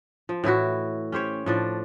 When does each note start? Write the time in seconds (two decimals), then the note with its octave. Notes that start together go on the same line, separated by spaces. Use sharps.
0.29 F3
0.44 A2 E3 E4 F#4
1.12 C#4 G4 C5 C#5
1.46 A2 F3 D4